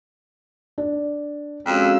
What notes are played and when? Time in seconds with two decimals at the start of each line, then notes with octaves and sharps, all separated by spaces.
0.78 D4
1.66 F2 G#3 C4 C#4 F#4 F5 E6